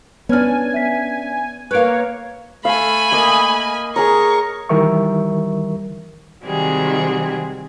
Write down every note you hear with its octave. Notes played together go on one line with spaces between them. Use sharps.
B3 C#4 D4 C#5 G#5 F6
E5 B6
A#3 B4 C#5 F5 F#6 D7
A3 F5 G#5 B5
A#3 D#5
G#4 A#4 C#5 C#6
D#3 E3 G3 A#4 E5 C#6
C3 D#3 F#3 G3 G#4